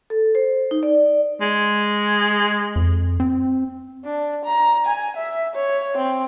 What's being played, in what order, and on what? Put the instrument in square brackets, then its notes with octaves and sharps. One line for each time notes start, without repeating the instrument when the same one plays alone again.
[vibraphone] A4
C5
D#4
D5
[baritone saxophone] G#3
[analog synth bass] F2
C4
[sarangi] D4
A#5
G#5
E5
C#5
C4